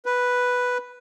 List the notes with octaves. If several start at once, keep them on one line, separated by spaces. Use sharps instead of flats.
B4